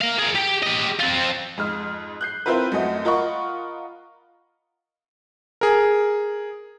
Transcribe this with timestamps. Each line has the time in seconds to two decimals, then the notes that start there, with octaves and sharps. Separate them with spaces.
0.01 A#4 F5
0.19 G#4 A#4
0.35 G4 G5
0.62 G4 D#5
0.99 C4 F4
1.57 F2 G#2 F6
2.21 F#6 G6 C7
2.46 C4 E4 F4 A#4 B4
2.72 F#2 A3 F#4 D#5
3.05 F4 A#4 D#5 F#5 B5 C#6
5.61 G#4 A#4